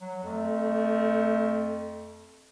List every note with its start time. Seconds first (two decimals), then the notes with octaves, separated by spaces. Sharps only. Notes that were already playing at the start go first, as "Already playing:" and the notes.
0.01 F#3
0.24 F2 A3